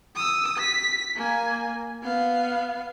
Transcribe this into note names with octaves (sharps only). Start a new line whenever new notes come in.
D#6 E6
B6
A#3 G#5
B3 F5